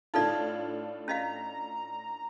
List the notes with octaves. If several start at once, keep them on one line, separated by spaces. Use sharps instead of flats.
A2 D4 D#4 F4 A4 D5
C#4 D#5 F5 A#5